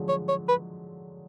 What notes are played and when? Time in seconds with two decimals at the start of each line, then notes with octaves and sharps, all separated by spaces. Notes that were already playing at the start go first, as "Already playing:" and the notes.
Already playing: D3 F3 F#3 G#3
0.09 C#5
0.29 C#5
0.49 B4